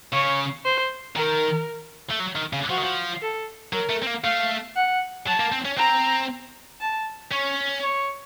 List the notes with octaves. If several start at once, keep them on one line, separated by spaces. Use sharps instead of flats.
C#3 C#5
C5
D#3 A#4
A3
F#3
D#3
C#3
F3 F#4
D#3
F3
A4
F#3 A#4
A3
C4
A#3
A3 F5
F#5
F#3 A5
A#3
C4
C#4
C4 A#5
A5
C#4 C#5
C#5